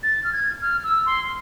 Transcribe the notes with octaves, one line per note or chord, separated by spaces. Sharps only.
A6
F6
G#6
F6
E6
C6